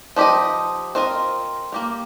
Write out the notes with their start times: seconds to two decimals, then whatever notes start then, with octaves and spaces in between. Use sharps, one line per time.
0.16 F3 D#4 G4 D#5
0.95 C4 F4 A#4 D#5
1.72 A#3 G4 A#4